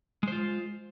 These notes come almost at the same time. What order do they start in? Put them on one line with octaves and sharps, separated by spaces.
G#3 C5 F4